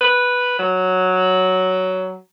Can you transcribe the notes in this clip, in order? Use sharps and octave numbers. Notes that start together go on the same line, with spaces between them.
B4
F#3